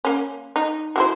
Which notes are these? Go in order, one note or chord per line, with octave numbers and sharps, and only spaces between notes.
A#3 C#4
D#4
F#3 E4 C5